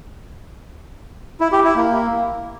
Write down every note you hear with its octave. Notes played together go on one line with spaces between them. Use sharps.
E4
G4
E4
A#3